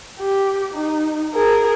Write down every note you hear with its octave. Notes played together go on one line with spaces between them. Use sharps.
G4
D#4
G#4 A#4